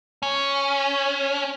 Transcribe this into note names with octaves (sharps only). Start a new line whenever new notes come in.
C#4